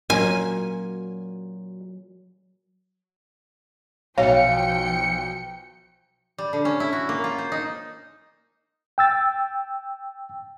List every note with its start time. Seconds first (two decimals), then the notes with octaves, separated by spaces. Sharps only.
0.10 A#2 F#3 A#3 C#4 G#5
4.18 B1 F3 C#5 F5 G5 C#7
6.38 G3
6.53 D3
6.65 C#4
6.80 E4
6.93 F#4
7.09 A#3
7.24 F4
7.38 C5
7.52 D#4
8.98 G5 E6 A6